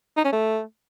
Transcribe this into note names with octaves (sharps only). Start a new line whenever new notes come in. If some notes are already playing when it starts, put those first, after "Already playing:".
D#4
C#4
A3